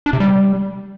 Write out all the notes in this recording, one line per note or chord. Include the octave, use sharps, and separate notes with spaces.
D4
C3
G3